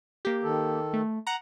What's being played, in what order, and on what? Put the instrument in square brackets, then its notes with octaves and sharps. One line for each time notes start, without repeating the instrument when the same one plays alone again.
[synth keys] A#3 G4
[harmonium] D#3 A4
[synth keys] A3
F#5 A#5